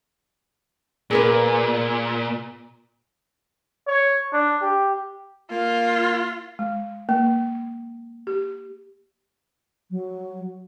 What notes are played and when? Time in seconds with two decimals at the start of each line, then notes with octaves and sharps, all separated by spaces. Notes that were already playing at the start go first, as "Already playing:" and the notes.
1.11 A#2 G#4 A#4 B4
3.87 C#5
4.33 D4
4.62 G4
5.51 A#3 F4
6.59 G#3
7.09 A#3
8.27 G4
9.91 F#3